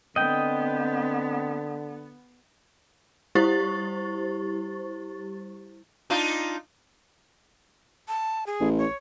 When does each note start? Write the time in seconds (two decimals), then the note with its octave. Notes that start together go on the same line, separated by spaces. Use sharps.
0.16 D3 B3 C4 D#5 G5
3.35 G3 E4 G4 C5 C#6 A6
6.10 D4 D#4 F4
8.08 A5
8.47 G#4
8.60 A1
8.79 C#5